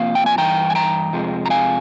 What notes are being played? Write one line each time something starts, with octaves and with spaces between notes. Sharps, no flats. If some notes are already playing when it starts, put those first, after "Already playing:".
Already playing: C3 F3 A#3 F5
G5
G#5
G2 E3 G5 A#5
G#5
G5 A#5
F2 C3 F3 G#3
A#5
F5 G#5